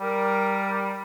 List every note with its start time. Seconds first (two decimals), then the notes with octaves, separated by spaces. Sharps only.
0.01 G3 A#4